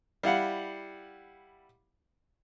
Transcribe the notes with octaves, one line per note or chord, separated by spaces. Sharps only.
G3 E4 F5 F#5